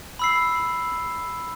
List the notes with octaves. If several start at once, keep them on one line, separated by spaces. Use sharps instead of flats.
B5 E6 C7